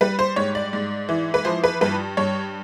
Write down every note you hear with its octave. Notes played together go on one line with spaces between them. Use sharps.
G3 B4
C5
G#2 C#5
D5
G#2
E3
B4
F3 C5
B4
G2 B4
G2 C#5